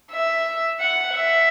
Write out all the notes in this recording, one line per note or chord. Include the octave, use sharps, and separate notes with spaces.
E5
F#5
E5